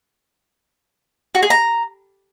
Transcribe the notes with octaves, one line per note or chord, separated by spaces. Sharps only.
F#4
G#4
A#5